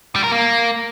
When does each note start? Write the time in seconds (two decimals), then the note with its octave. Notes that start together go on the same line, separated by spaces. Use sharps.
0.16 G3
0.24 A#4
0.32 A#3